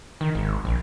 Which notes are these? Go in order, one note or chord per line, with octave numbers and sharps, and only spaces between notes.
D#3
G#1
A#1